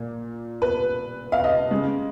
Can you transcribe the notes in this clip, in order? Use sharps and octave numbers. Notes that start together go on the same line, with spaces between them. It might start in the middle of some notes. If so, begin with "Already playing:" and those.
Already playing: A#2 A#3
B4
F5
D#5
C#3 G#3